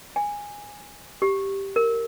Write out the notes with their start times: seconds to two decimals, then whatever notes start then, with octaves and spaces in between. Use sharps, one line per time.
0.16 G#5
1.22 G4
1.76 A#4